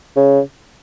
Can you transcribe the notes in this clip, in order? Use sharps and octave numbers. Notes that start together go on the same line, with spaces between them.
C#3